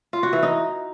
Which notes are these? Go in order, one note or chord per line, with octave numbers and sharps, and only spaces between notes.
F4
F#4
E3
D#4